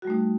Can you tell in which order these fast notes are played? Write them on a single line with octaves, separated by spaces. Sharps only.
F#4 G3 A3 D#4